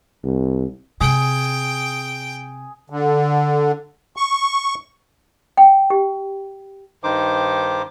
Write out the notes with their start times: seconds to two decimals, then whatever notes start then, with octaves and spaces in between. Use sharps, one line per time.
0.24 C2
1.01 C3 G#4 G5
2.90 D3
4.16 C#6
5.57 G5
5.90 G4
7.04 G2 D#3 D#4 C5 D6